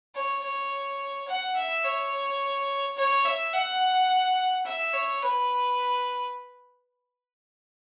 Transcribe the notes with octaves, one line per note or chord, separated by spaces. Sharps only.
C#5
C#5
F#5
E5
C#5
C#5
E5
F#5
E5
C#5
B4